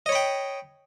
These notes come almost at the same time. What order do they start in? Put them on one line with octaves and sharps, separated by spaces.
D#5 C#5 B5 G5